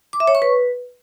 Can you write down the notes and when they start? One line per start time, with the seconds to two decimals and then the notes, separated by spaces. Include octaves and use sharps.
0.13 D6
0.20 E5
0.27 C#5
0.35 C#6
0.42 B4